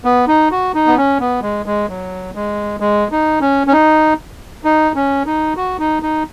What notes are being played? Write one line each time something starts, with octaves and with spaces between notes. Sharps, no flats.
B3
D#4
F#4
D#4
B3
C#4
B3
G#3
G#3
F#3
G#3
G#3
D#4
C#4
C#4
D#4
D#4
C#4
D#4
F#4
D#4
D#4